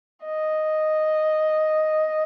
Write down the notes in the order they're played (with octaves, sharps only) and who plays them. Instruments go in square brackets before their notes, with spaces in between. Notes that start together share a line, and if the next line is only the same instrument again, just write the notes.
[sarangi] D#5